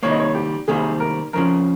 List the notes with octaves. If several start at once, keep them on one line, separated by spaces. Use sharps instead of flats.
C3 D#3 G3 A#3 C#5
D#5
C#5
G4
C3 D#3 G3 A#3 G#4
A#4
F2 C#3 F3 A#4